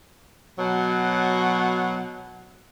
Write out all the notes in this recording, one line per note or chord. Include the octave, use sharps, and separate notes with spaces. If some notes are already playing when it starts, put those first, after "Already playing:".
B2 F#3